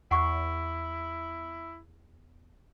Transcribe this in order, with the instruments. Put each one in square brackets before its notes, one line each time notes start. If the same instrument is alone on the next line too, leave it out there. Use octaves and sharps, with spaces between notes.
[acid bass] E2 [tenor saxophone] E4 [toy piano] F#5 C#6